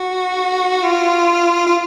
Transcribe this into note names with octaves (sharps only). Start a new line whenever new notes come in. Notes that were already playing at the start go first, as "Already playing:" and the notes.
Already playing: F#4
F4
F4